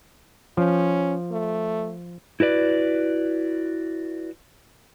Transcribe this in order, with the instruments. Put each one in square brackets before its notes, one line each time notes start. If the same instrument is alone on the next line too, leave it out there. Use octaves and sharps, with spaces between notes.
[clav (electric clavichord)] F3 [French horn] C#4
[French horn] A3
[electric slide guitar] E4 F#4 B4 D5